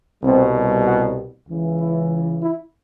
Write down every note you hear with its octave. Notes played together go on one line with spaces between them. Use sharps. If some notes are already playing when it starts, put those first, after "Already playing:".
C2 B2 G3 C4
F#4
C#2 C#3 E3
E4
E4